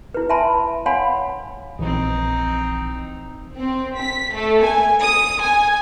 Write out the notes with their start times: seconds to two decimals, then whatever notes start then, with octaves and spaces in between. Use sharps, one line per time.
0.14 E4 B4
0.29 E5 G#5 A5 B5 C6
0.86 C#5 F5 F#5 G#5 B5 C6
1.79 A#1 E3 C4 D#4
3.56 C4
3.96 B6
4.33 A3
4.63 G#5
4.99 D#6
5.41 G#5